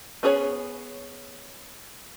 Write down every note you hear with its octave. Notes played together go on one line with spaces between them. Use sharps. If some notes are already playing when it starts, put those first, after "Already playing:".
B3 C#4 G#4 A#4 C#5